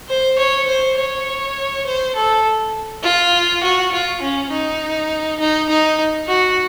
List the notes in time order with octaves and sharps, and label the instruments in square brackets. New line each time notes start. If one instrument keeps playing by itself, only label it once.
[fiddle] C5
C#5
C5
C#5
C5
A4
F4
F#4
F4
C#4
D#4
D#4
D#4
F#4